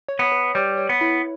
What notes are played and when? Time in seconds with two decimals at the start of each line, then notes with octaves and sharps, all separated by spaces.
0.08 C#5
0.19 B3
0.32 B4
0.55 G3 C#5
0.77 C#5
0.89 B3
1.01 E4